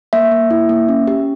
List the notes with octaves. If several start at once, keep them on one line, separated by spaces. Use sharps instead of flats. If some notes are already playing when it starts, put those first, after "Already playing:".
A#3 E5
A#3
E4
A#3
C#4
G4